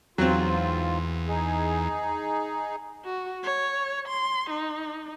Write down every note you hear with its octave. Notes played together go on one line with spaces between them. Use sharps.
E2 G#2 F#3 C4 F4
D#4 G#4
F#4
C#5
C6
D#4